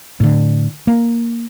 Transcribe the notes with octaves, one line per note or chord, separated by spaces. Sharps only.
A2 D3
A#3